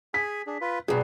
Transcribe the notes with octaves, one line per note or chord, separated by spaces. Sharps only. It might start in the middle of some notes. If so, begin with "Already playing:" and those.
G#4 G#5 B6
D4 G#4
F4 B4
G2 B2 F#3 G#4